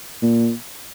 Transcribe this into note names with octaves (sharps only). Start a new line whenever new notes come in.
A#2